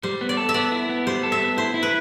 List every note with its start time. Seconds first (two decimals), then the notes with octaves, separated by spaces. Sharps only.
0.03 G3 C5
0.21 B3
0.29 D5
0.37 A4
0.49 E5
0.54 B3 D5
0.72 E4
0.89 B3
1.07 G3 C5
1.23 A4
1.32 E5
1.41 B3
1.57 E4 C5
1.74 E4
1.83 B4